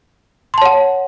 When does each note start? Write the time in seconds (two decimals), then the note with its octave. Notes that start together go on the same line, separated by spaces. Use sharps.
0.54 C6
0.58 A5
0.62 C#5
0.66 F#5